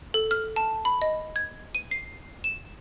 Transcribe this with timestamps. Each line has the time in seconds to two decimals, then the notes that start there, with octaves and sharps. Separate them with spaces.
0.14 A4
0.31 F6
0.56 A5
0.85 B5
1.02 D#5
1.36 G#6
1.75 D#7
1.91 C7
2.44 E7